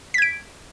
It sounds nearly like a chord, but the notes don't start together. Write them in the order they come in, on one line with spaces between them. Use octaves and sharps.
B6 G#6 D7